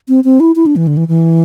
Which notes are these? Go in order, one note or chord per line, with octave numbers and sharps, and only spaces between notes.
C4
C4
E4
E4
D4
E3
D3
E3
E3